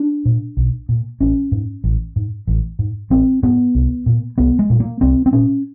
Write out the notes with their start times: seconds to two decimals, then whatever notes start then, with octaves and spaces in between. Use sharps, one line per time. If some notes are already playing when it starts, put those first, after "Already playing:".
Already playing: D4
0.25 A#2
0.57 B1
0.89 A#2
1.21 A1 C#4
1.52 G#2
1.84 A1
2.16 G#2
2.47 A1
2.79 G#2
3.10 A1 C4
3.43 G#2 B3
3.75 C2
4.06 A#2
4.38 C2 B3
4.59 G#3
4.70 A#2
4.80 A#3
5.01 C2 C4
5.26 C4
5.33 A#2 C#4